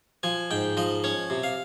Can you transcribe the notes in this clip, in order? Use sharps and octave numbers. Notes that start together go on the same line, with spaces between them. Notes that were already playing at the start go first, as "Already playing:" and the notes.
F3 G#5
G#2 G5
F3 D#5
C#4 C#5
C3
F5